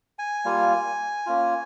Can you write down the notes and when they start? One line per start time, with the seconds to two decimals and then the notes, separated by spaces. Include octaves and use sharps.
0.19 G#5
0.45 G3 A#3 F4
1.26 A#3 C#4 F4